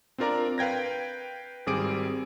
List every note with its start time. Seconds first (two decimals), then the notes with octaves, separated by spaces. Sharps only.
0.18 C4 D4 F4 A#4 D5 A#5
0.58 B4 F5 G5 G#6 A#6
1.66 G#1 G3 C4 G#4 D6 D7